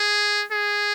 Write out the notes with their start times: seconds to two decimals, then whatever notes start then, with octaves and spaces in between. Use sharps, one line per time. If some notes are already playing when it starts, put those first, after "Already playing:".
Already playing: G#4
0.52 G#4